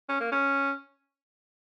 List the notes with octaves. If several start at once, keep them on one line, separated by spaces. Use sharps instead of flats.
C#4
A#3
C#4